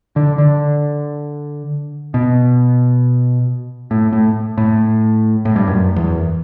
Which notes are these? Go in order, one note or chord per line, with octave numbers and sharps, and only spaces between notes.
D3
D3
B2
A2
A2
A2
A2
G2
F#2
E2